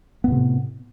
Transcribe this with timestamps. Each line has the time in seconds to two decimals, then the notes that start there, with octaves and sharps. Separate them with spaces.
0.24 B3
0.28 A2
0.32 C3